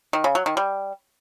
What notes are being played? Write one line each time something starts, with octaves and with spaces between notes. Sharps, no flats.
D#3
C#3
F#3
D#3
G3